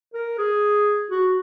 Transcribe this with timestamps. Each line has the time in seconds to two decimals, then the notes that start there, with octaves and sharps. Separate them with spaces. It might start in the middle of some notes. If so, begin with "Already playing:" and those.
0.14 A#4
0.38 G#4
1.11 F#4